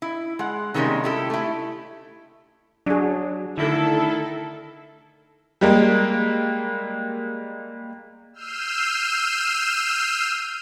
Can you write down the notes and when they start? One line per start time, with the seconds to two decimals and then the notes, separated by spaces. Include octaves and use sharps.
0.02 E4
0.39 G#3 F#5
0.74 C3 D#3 G3 G#3 A#3 C#4
1.04 E4 G4 A4
1.30 A3 E4
2.86 F#3 D4 G#4
3.58 D3 D#3 A3 E4 A4
5.61 G3 G#3 A#3
8.33 E6 F6 G6 C7 D#7 E7